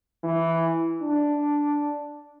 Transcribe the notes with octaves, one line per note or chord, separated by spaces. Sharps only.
E3
D4